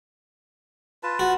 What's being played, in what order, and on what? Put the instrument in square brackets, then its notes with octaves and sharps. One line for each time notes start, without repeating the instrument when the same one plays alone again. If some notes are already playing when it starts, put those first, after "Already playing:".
[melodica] F4 B4 A5
[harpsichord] F#4